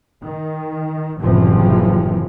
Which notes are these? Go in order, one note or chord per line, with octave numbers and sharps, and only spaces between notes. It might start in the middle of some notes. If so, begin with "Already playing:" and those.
D#3
F#1 F#2 A2 C3 E3 F3